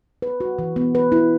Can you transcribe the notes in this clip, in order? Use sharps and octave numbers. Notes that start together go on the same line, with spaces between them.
B4
F#4
E3
B3
B4
E4